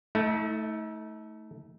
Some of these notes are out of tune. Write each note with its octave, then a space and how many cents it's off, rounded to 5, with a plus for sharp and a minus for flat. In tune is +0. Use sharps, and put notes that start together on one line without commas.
A3 -5 D#4 +45